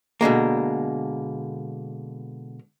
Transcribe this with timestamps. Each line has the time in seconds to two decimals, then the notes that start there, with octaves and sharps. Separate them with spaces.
0.21 B2 D3 G#3 A#3